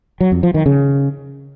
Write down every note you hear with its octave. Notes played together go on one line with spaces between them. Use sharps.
F#3
F2
F3
D#3
C#3